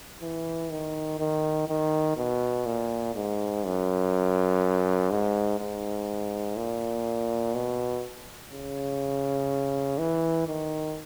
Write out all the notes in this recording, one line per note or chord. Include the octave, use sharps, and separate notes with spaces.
E3
D#3
D#3
D#3
B2
A#2
G#2
F#2
G#2
G#2
A#2
B2
C#3
E3
D#3